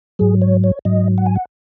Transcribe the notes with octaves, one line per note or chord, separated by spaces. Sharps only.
G#2 F#3 G#4
C#5
C#5
G#2 F#3 D#5
F#5
G#5
F#5